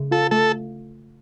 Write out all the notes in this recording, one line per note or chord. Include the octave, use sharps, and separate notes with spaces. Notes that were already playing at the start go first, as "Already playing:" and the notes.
Already playing: C#3
F4 A4
A3 A4